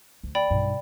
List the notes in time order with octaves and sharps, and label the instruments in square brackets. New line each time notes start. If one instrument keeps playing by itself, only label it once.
[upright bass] D2
[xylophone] D5 G5 B5
[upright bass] B1 G2